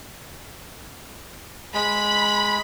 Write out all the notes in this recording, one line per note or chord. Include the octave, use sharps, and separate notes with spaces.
G#3 B5